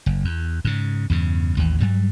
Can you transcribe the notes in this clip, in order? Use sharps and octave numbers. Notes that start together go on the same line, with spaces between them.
F#1
E2
G#2 C#3
E2 G2 C#3
A1 D#2 E3
G2 F#3 G3